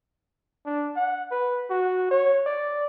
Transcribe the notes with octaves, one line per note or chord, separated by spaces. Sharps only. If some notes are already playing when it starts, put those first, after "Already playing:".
D4
F#5
B4
F#4
C#5
D5